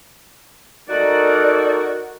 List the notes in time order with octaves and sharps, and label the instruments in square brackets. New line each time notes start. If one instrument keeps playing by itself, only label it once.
[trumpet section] D#4 A4 A#4 [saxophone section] F#4 [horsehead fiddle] D5